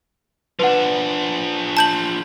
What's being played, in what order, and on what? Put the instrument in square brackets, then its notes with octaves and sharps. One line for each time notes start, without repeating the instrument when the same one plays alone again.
[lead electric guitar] F3 D4 [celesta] B4 F#5
[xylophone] A5 G6 F#7